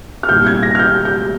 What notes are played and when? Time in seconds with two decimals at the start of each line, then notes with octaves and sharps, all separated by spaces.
0.23 F6
0.29 C2 A#2 G3 G6
0.47 G#6
0.63 A#6
0.75 F6
0.79 G6
1.05 G6